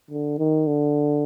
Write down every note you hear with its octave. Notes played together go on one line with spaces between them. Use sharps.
D3
D#3
D3